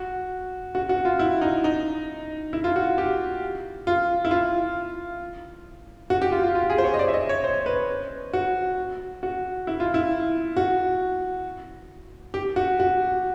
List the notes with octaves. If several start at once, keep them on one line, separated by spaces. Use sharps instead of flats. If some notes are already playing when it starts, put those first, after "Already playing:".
Already playing: F#4
F#4
F#4
F4
E4
D#4
D#4
E4
F4
F#4
G4
F4
E4
F4
F#4
G4
F4
F4
F4
G#4
C5
C#5
D#5
D5
E5
D#5
C#5
C5
B4
F#4
F#4
E4
F4
E4
F#4
G4
F#4
F#4